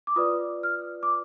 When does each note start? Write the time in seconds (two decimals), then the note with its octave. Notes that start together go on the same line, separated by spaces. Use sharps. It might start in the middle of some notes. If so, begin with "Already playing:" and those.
0.07 D6
0.16 F4 B4 D5 D#6
0.63 F6
1.03 D6